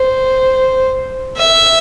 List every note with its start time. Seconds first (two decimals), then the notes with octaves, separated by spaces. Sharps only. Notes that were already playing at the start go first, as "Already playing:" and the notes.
Already playing: C5
1.37 E5